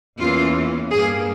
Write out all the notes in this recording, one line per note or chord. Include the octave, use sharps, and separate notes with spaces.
E2 E3 A#3 C#4 F4
G2 G3 A#3 G#4